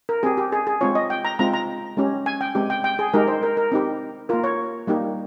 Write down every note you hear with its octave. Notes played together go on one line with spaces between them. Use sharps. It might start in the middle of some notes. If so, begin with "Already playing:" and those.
A#4
C4 G4 G#4
G4
G#4
G#4
G#3 C4 F4 C#5
D#5
G5
A#5
G#3 C4 F4 A#5
A#5
G#3 C#4 G4
G#5
G5
G#3 C4 G4
G5
G5
G#4
G#3 D#4 G4 A#4
C5
A#4
A#4
C4 D#4 G4
A#3 F4 A#4
C#5
G3 A#3 D#4 G4